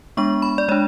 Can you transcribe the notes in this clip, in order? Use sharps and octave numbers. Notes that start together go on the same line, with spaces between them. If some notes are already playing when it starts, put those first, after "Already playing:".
G#3 B3 D4 C#6
B5
D5
G#3 D4 C#5